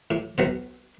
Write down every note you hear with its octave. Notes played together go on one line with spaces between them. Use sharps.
A2
B1 B3 C5